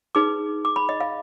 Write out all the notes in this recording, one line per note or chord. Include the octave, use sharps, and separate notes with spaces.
D#4 G#4 B4 D6
D6
B5
D#5
F5